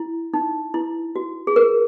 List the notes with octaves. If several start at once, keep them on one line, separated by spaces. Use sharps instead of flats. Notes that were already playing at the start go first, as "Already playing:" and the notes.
Already playing: E4
D#4
E4
F#4
G#4
A#4